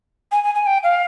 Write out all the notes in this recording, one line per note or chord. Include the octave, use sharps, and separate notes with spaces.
G#5
G#5
G#5
G5
F5